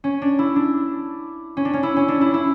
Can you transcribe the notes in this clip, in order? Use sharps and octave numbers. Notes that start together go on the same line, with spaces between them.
C#4
D4
E4
D4
C#4
D4
C#4
E4
C#4
D4
E4
E4